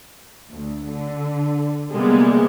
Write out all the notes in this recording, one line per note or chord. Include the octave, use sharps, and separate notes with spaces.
D2
D3
C3 G3 G#3 A#3 B3